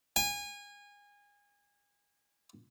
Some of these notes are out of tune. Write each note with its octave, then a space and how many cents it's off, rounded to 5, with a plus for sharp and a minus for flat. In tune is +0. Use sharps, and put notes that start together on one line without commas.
G#5 -25